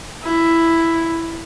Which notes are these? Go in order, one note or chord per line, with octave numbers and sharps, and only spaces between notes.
E4